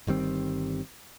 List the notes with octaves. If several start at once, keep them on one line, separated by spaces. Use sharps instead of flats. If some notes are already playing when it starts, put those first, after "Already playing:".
G1 D#3 G3 C4